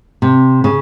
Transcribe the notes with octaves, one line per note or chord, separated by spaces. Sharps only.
C3
C#3